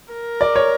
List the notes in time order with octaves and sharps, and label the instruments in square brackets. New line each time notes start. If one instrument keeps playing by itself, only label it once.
[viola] A#4
[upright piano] D5
C#5